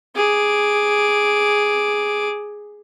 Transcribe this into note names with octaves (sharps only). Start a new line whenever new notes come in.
G#4 D6